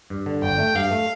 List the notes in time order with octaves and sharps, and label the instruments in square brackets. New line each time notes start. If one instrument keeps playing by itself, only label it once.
[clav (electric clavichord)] G2
D3
[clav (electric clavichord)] G1 [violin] G5
[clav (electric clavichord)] A3
[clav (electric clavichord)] G2 [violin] F5
[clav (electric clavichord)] A3